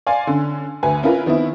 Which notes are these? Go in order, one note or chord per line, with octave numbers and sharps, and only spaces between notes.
D5 F5 G#5 C6
D3 C#4
D2 B4 G#5
C#4 E4 F4 A#4 B4
D#3 B3 C4 E4